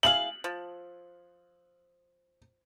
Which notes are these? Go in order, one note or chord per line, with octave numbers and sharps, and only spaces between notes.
E4 G#4 F5 F#7
F3